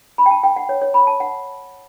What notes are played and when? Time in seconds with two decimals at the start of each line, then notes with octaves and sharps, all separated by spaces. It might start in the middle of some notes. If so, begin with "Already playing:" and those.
0.18 B5
0.26 G5
0.31 A5
0.43 G5
0.56 F#5
0.69 C#5
0.82 C#5
0.94 B5
1.07 A5
1.20 F#5